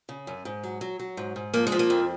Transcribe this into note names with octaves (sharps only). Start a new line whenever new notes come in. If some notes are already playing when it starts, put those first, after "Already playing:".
C#3
F#2
G#2
F#3
F#3
F#3
G#2
G#2
F3 A#3
G#3
F3
A#3
F2